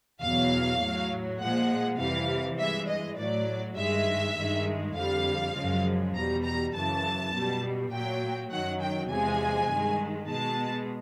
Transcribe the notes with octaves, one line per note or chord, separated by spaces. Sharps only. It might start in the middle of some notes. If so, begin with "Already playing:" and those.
E2 B2 F#3 F5
A2 F#3
A#2 F3 G#3 F#5
F2 C3 E3 G3 F5
G2 E3 G#3 E5
D#5
A2 F#3 D5
G2 D#3 G#3 E5
G2 D#3 G#3
F2 D3 G3 F5
F#2 C#3 F3 G#3
E2 B2 G3 A#5
A#5
F#2 C#3 E3 A5
B2 G3
A#2 F#3 G5
F#2 D#3 F#3 F#5
G5
E2 C3 F3 G#3 G#5
G2 D#3 G#3
B2 G#3 A5